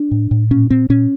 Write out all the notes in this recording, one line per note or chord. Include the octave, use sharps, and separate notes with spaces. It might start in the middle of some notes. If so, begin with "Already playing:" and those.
Already playing: D4
A2
A2
A#2 C#4
A#2 C4
A#2 C#4